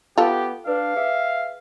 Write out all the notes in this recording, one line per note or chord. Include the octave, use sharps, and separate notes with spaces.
B3 F4 G4 A4
D4 B4 F5
G#4 E5